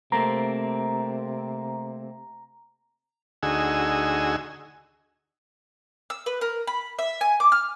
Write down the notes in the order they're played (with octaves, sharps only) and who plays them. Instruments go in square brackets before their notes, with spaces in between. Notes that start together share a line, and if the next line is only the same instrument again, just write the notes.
[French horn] C3 [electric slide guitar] A3 A#3 C4 [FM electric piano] A#5
[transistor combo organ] D2 D#4 F#4 G#4 G#5 E6
[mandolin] E6
B4
A#4
B5
E5
G#5
D6
F6